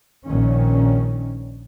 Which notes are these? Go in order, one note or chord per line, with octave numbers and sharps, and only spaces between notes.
A#1 A#2 D#3 C#4